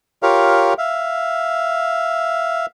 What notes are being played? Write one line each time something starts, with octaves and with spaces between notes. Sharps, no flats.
F4 G4 A#4 C#5 F5
E5 F5